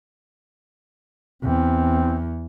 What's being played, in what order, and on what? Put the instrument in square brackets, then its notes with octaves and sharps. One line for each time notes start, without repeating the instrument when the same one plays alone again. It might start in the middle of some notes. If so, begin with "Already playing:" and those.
[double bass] E2 [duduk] C4